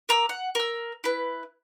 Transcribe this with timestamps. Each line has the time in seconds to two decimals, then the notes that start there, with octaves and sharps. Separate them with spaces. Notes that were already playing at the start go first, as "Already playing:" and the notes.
0.09 A#4 A#5 D6 E6
0.29 F#5
0.55 A#4 E6
1.04 E4 B4